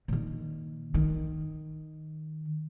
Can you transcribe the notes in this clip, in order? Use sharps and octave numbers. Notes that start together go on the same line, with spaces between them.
A#2 D#3
D#3